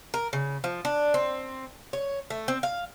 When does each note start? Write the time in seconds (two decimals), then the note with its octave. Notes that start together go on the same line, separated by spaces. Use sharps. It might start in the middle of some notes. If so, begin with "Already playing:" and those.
0.14 A#4
0.33 C#3
0.64 F3
0.85 D4
1.14 C4
1.93 C#5
2.30 A3
2.48 C4
2.63 F5